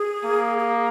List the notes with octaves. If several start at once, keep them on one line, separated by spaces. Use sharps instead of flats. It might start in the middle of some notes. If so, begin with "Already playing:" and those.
Already playing: G#4
A#3
G#4